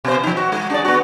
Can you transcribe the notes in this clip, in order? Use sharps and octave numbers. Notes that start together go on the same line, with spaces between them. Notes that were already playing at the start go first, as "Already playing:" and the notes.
B2 C5
F3 D#4
F#4
G#3
D4 G#4 D5
B3 F#4